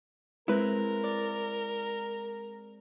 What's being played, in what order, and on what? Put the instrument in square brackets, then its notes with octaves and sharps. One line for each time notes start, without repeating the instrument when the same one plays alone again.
[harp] G#3 C4 [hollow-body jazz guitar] E4 B4 [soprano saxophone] A#4
[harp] D5